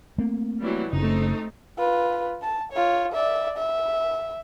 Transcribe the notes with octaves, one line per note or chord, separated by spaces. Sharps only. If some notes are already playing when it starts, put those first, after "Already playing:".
A3 A#3 C4
E3 F#3 G3
F#1 C#3 A3 C4 D#4
F4 B4
A5
F4 C#5
D5 E5
E5